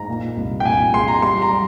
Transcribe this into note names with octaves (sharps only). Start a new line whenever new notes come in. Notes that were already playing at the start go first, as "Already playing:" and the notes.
Already playing: G#2 A#5
A#2
C2
G5
A#2 G#5
G#3 C6
A#5
G3 C6
A#5
G3